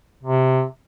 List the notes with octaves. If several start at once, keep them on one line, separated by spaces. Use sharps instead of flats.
C3